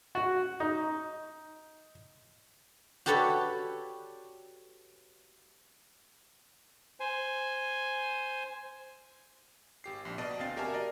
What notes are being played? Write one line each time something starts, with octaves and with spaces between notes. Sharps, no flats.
F#4
D#4
F#4 G4 A4 B4 C#5 D5
C5 G#5
G#1 G4 C7
A#1
B2 D5 D#5 A5 C7
D2 C4 F5 G5 A6 C7
F#4 G4 A#4 E5 G#5 A5
A#4 D5 D#5